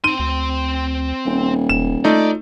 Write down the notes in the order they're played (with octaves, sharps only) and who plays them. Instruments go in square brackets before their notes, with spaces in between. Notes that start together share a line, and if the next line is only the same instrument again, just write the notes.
[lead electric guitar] C4 C6 [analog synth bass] D#4 [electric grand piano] D#7
[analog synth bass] D2
[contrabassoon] D#1
[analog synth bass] E1 [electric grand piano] E7
[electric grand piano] A3 D#4 [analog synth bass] F4 [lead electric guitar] D5